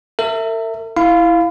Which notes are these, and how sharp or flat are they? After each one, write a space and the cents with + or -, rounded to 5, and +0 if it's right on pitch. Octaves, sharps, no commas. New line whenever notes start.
A#4 -45 E5 +0
E4 +0 F5 +0 B5 +35